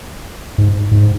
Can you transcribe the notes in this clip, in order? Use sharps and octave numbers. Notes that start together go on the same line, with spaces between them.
G#2
G#2